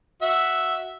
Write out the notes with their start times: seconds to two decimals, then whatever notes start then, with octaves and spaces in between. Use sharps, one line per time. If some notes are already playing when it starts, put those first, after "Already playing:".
0.22 F#4 E5